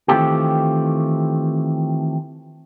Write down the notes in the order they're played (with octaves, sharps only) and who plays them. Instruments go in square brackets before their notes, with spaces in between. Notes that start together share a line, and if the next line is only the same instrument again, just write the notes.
[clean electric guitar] D#3 E3 A3 C4 F4 G4